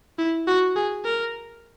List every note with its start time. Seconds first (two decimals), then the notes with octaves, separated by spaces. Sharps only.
0.18 E4
0.48 F#4
0.76 G#4
1.05 A#4